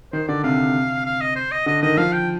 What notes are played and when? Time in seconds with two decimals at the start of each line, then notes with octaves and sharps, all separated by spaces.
0.13 D#3 C5
0.28 D3 D5
0.44 C3 F5
1.06 F5
1.21 D#5
1.36 C5
1.51 D#5
1.66 D3 D#5
1.82 D#3 D#5
1.97 F3 F5
2.13 G5